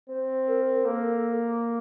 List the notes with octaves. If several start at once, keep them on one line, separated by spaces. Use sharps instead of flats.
C4 C5
A#4
A#4
A#3 A4